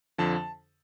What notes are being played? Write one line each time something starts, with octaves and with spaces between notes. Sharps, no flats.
F2 D3 F3 A5